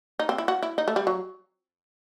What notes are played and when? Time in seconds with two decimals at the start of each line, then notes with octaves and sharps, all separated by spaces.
0.20 D#4
0.29 C4
0.38 E4
0.48 F#4
0.63 E4
0.78 D#4
0.88 A3
0.96 G3
1.07 F#3